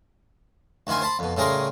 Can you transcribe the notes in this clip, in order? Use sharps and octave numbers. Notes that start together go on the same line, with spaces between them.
D2 D#3 E4 F4 G#5
C5 A5 B5
F2 B2
A2 C#3 G3 G#4 A#4 C6